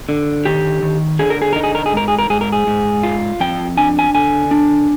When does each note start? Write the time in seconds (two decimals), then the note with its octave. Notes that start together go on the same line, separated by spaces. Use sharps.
0.09 D3
0.45 D#3 G4
0.82 D#3
1.19 D3 G#4
1.30 A#4
1.42 G#4
1.53 D#4 A#4
1.63 G#4
1.75 A#4
1.86 G#4
1.93 G#2 A#4
2.08 G#4
2.19 A#4
2.30 G#2 G#4
2.41 A#4
2.52 G#4
2.67 G#2
3.03 F4
3.40 F2 G5
3.77 D4 G#5
3.99 G#5
4.15 D3 G#5
4.51 D4